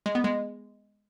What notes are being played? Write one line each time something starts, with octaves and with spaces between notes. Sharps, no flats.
G#3
B3
G#3